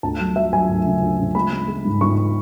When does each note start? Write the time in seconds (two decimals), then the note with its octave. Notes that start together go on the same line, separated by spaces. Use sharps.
0.03 D2 A5
0.20 F#3
0.36 F#3 E5
0.53 F#3 G#5
0.69 D2
0.86 C#3
1.02 D2
1.19 C#3
1.35 G#3 B5
1.52 G#3
1.68 G#3
1.85 G#2
2.01 G#2 C#6